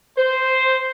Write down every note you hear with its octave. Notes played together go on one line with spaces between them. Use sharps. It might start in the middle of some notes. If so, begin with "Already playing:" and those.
C5